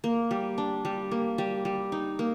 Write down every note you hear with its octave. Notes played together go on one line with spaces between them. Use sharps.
A#3
G3
D4
G3
A#3
G3
G3
D#4
A#3